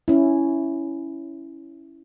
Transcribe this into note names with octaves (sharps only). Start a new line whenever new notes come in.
C#4 E4